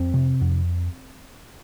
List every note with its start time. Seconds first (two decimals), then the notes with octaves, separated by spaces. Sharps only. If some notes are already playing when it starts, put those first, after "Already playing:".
Already playing: F2 C4
0.14 C3
0.41 F2